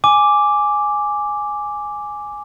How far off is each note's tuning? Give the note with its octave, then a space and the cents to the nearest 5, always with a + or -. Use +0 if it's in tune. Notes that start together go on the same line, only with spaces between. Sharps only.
G#5 +0 D6 +0